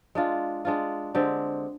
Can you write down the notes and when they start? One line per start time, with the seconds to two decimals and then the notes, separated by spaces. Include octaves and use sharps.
0.15 G#3 D4 F4
0.65 G#3 D4 F4
1.15 D3 G#3 C4 G4